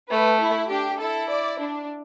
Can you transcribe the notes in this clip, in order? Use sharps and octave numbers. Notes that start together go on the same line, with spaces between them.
A3 B4
E4
D4 G4
E4 A4
D5
D4